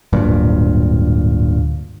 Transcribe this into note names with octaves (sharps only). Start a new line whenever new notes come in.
D1 G2 A#2